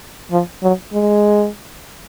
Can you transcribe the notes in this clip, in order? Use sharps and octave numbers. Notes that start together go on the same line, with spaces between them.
F3
F#3
G#3